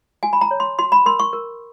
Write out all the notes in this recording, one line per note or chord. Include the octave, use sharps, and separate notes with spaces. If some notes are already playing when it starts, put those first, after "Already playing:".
F#4 G#5
B5
A#5
C#5
C6
F#4 C6
B5
A#4 C6
C#6
A#4